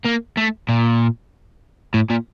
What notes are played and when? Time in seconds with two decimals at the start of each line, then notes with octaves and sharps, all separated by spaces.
0.05 A#3
0.37 A3
0.69 A#2
1.94 A2
2.10 A#2